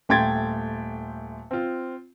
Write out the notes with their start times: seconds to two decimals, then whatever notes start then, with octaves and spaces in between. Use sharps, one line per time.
0.09 D#1 A3 G5 C6 G#6 A6
1.51 C4 F4